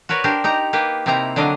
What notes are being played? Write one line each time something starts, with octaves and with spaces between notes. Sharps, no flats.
F#4 A#4 B4 C#5 D5
D4 G4 A#4 C5
D#4 G4 A#5
A#3 G4 B4
C3 A#3 C4 D#4 E4 A#5
D3 F#3 D4 D#5 F5